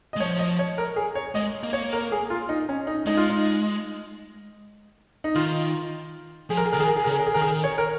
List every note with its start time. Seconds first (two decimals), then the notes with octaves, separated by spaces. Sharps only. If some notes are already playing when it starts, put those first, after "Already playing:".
0.13 D#5
0.16 G#3
0.20 F3 C#5
0.39 D#5
0.59 C#5
0.78 A#4
0.96 G#4
1.15 C#5
1.35 G#3 D#5
1.63 A#3
1.73 C#5
1.93 A#4
2.12 G#4
2.30 F4
2.49 D#4
2.69 C#4
2.87 D#4
3.06 G#3 D#4
3.17 F4
3.30 D#4
5.24 D#4
5.35 D#3 F4
6.50 F3 G#4
6.57 A#4
6.66 G#4
6.73 C#3 A#4
6.78 D#3 G#4
6.88 A#4
6.96 G#4
7.04 A#4
7.07 C#3
7.11 G#4
7.20 A#4
7.27 G#4
7.34 D#3 A#4
7.41 G#4
7.64 C#5
7.78 A#4